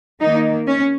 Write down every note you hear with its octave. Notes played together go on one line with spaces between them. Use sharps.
D#3 A#3 D#4
C#4